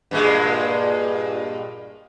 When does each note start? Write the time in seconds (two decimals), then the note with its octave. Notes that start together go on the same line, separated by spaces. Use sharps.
0.11 G2 A#2 G#3